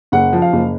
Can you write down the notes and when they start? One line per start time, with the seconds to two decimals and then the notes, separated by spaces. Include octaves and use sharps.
0.12 F#1 F#5
0.33 F3
0.42 F5
0.53 F#1